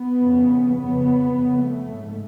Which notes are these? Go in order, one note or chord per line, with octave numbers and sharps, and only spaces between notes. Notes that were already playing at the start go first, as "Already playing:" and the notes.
Already playing: B3
F2 C#3
F2 C#3 B3
F2 C#3
A3
G#2